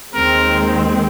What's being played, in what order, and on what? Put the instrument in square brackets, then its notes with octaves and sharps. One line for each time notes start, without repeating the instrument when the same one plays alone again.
[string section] D#2 D#3 G#3 C4 [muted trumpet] A#4